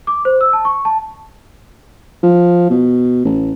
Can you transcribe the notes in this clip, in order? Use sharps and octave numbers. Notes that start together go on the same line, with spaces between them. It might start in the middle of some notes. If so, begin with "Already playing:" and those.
D6
C5
E6
A5
C#6
A5
F3
B2
A1